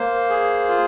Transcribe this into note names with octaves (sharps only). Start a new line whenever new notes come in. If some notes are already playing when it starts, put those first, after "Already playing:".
Already playing: A#3 C5
G#4
F4